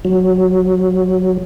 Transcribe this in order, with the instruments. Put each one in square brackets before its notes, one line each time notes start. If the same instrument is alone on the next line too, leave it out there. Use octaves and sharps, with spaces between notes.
[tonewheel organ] F#3